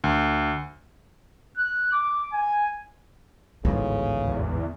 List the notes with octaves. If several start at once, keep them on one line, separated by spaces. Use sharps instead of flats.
D2
F#6
D6
G#5
A1 D2 G#2 C#3 B3
E2